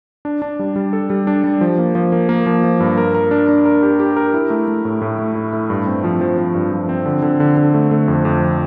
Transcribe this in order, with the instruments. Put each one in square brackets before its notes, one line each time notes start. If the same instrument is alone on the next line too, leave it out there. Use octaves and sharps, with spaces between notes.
[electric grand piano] D4
D4
G3
G3
A4
G3
D4
G3
F3
A#3
F3
A#3
A#3
F3
F3
G2
A#4
A#4
D4
D4
A#4
G4
G4
A#4
E4
A3
A3
A2
A2
A3
E4
A3
G2
C4
F3
F3
F3
G2
F3
C4
D3
D3
D3
D3
A3
A3
F2
F2